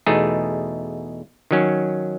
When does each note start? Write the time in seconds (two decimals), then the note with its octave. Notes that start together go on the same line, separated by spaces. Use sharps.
0.06 E2 B2 A3 D#4 G#4
1.51 D#3 F#3 C#4